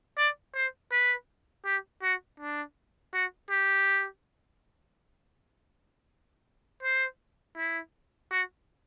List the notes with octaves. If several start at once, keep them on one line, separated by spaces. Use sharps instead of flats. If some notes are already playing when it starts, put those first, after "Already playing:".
D5
C5
B4
G4
F#4
D4
F#4
G4
C5
E4
F#4